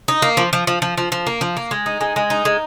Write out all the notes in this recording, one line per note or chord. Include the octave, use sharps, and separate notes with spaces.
D#4
A#3
F3
F3
F3
F3
F3
F3
A#3
F3
A#3
G#3
D#4
G#3
G#3
D#4
G#3